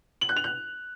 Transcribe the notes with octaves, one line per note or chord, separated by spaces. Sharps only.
F#7
F#6
F7
F#6